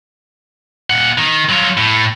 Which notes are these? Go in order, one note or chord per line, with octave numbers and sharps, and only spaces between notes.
A#2 F#5
D#3
F#3 F4
A2